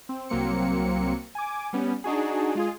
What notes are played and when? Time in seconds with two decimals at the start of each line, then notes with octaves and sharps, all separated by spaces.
0.09 C4
0.29 C2 F#3 A#3 C4 C#7
1.35 G#5 D6
1.73 G3 B3 C#4
2.04 D4 D#4 F#4 G#4
2.55 G#3 F4 G#4